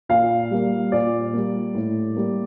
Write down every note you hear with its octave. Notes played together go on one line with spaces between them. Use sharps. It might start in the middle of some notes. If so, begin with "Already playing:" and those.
A#2 F5
G3 A#3
A#2 D5
G3 A#3
A2
G3 A#3